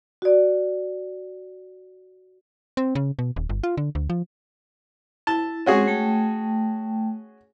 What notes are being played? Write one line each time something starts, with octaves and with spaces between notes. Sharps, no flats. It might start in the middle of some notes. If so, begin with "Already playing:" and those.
F#4 D5
C4
C#3
B2
D#1
G1
F4
D3
D2
F3
E4 A5
G#3 C4 C#4 F#4 G#4
A3 G5 A5